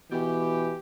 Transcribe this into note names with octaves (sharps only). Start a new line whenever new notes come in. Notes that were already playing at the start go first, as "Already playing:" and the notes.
B2 E3 G4